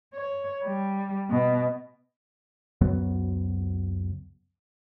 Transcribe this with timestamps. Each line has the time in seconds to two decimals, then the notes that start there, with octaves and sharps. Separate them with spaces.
0.14 C#5
0.64 G3
1.30 B2
2.81 C#2 F#2 F#3 B3